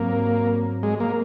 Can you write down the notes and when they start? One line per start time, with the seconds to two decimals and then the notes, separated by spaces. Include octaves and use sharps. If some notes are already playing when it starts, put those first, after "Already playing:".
Already playing: G#2 F#3 A#3 C4
0.83 G#3
1.00 A#3